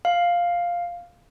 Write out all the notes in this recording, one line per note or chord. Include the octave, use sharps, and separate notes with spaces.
F5